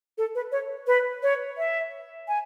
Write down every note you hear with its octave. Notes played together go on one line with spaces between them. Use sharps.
A4
B4
C#5
B4
C#5
E5
G#5